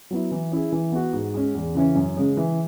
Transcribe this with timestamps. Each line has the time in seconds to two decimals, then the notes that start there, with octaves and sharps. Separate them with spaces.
0.11 F#3 B3 E4
0.31 E3
0.52 C#4 E4 G#4
0.72 E3
0.92 B3 F#4
1.13 G#2
1.34 G#3 C#4
1.55 E2
1.75 C#3 E3 C#4
1.95 F#2
2.17 C#3 G#3 C#4
2.37 E3